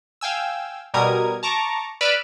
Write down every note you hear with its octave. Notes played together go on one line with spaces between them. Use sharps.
F5 G5 G#5 E6
B2 G3 A#4 D#6 G#6
A5 A#5 C#6 D6
B4 D5 B5 E6 F6 D7